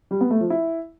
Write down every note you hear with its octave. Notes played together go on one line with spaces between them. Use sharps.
G3
B3
A3
F3
E4